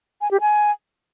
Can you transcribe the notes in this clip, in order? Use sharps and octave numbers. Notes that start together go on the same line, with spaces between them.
G#5
G4
G#5